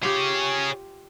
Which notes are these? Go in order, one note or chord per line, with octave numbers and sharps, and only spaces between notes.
F4 G4 G#4 C#5